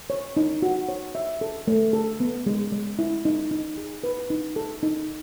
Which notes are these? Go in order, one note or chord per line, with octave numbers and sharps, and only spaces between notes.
C#5
D#4
F#4
C#5
E5
A4
A3
A4
B3
G#3
G#3
E4
D#4
D#4
G#4
B4
D#4
A4
D#4